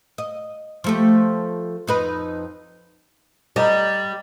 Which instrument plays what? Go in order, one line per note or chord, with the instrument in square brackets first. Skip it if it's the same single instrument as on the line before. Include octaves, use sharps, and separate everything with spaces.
[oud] D#5
F3 A3 G4
F2 D#4 B4
[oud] G3 [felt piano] D#5 A#5